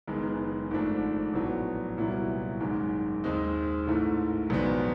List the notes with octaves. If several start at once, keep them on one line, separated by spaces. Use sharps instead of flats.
F#1 F#2 D#3 G#3 B3
G#1 G#2 F3 A3 D4
A#1 A2 F#3 B3
C2 A#2 F#3 B3 E4
G#1 F#2 D#3 G#3
D#2 D#3 G#3 C4 D#4
A1 G#2 E3 A3
A#1 G#2 D#3 F#3 B3